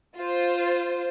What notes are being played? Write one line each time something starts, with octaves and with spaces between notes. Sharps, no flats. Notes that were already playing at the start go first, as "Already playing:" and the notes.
F4 C5